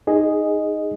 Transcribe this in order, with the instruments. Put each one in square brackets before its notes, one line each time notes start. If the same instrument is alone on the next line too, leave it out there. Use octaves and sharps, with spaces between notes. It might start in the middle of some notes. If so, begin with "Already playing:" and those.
[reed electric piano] D#4 G#4 D#5